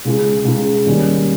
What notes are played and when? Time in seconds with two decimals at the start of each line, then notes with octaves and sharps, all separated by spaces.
0.05 C#2 C#3 G#3
0.45 C#2 C#3 G#3
0.86 D#2 D#3 G3 C#4